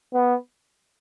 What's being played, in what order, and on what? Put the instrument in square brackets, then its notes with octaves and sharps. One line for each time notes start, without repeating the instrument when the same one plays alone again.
[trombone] B3